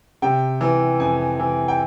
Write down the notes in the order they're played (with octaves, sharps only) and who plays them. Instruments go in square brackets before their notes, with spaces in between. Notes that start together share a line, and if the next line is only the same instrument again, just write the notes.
[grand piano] C3 G5
E3
F2 G#5
E3
G5